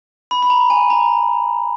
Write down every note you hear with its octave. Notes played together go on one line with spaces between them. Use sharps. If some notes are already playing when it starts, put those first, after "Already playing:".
B5
B5
A#5
G#5
A#5